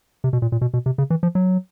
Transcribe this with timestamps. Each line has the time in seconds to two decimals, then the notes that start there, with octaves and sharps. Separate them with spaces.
0.24 C3
0.33 B2
0.42 A#2
0.52 A#2
0.61 B2
0.74 B2
0.86 C3
0.98 C#3
1.10 E3
1.23 F3
1.35 F#3